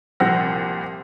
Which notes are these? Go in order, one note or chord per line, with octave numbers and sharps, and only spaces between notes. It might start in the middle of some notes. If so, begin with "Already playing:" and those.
C2 A#2 F3 G4 F#5 A#6